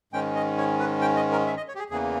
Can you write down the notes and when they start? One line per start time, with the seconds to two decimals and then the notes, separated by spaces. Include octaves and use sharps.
0.13 G#2 D#3 G#3 C#4 G5
0.36 D#5
0.58 C#5
0.79 B4
1.01 G5
1.16 D#5
1.32 A#4
1.47 E5
1.57 D#5
1.68 C#5
1.75 G4
1.79 G#4
1.90 E2 C#3 E3 A#3 G#4